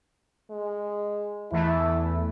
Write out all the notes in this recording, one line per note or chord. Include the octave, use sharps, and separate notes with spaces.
G#3
E2 E3 A3 E4